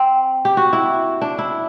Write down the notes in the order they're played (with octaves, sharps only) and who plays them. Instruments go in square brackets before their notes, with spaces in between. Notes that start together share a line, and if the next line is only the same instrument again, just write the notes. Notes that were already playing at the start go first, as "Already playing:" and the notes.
Already playing: [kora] C4
G4
F#4
E4
D4
E4